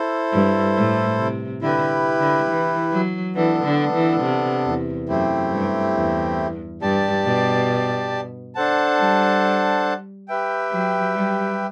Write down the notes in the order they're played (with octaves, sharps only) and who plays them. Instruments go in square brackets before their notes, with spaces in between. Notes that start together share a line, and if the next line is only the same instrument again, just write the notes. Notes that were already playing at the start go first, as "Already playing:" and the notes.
Already playing: [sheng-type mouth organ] E4 A4 C5
[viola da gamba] G2
A2
C3
[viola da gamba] D3 [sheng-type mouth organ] E4 G4 B4
[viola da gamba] D3
E3
F#3
[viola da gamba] E3 [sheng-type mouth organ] B3 D4 A4
[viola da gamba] D3
E3
C3
E2
[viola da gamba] F#2 [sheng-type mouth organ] A3 C4 E4 G4
[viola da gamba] G2
E2
[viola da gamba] G2 [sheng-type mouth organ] G4 D5 A5
[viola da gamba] B2
[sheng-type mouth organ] D4 A4 C5 F#5 A5
[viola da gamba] G3
[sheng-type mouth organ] G4 B4 E5 G5
[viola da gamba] F#3
G3